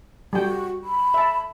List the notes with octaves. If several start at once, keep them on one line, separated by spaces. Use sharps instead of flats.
G3 F#4 G5
B5
E5 A5